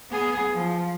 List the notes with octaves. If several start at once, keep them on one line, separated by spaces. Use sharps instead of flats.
B3 G#4
F3